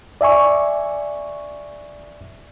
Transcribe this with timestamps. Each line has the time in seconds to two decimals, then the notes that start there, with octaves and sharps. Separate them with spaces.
0.21 D5 E5 G#5 C#6